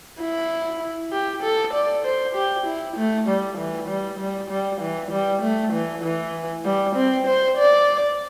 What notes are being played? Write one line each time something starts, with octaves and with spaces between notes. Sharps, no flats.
E4
G4
A4
D5
C5
G4
E4
A3
G3
E3
G3
G3
G3
E3
G3
A3
E3
E3
G3
C4
C5
D5